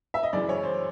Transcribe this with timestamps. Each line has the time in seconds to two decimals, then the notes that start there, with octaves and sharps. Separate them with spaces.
0.14 E5
0.23 D#5
0.33 F#2 C#3 E3 G#3 D5
0.49 C#5
0.63 C5